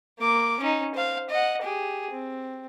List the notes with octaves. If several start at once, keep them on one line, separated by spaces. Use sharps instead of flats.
A#3 D6
C#4 D#4
C5 F5
D#5 F#5
G4 G#4
C4